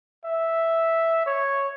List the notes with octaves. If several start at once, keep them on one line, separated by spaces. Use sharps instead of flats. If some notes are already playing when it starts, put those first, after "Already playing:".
E5
C#5